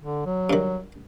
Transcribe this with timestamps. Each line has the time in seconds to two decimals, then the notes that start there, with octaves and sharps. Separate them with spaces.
0.02 D3
0.26 F#3
0.50 G2 D#3